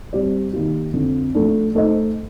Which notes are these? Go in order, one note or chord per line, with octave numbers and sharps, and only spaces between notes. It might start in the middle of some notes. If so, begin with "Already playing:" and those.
G3 C4 G4 D5
D#3 A#3 D#4 G4
F2 D3 F3
F3 A3 D4
A3 D#4 A4 C5 D#5